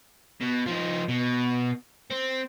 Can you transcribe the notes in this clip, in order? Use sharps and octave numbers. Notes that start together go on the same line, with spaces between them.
B2
F3 D#4
B2
C4